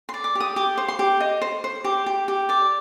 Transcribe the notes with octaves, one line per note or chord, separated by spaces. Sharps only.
C6
D5
D6
G4
D#6
G4 D6
C5
C6
G4
D#5
C5
C5
G4 D6
G4
G4
D5 D6